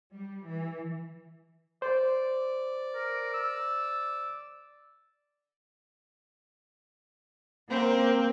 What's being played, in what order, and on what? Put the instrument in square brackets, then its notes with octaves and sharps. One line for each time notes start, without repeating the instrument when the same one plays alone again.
[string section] G3
E3
[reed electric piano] C5 [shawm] D5
[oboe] A#4
E6
[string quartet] A#3 C4 A#4